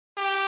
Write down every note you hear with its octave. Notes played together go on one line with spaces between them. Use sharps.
G4